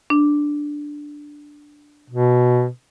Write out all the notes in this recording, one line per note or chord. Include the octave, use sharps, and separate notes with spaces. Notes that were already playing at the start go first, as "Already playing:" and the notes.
D4
B2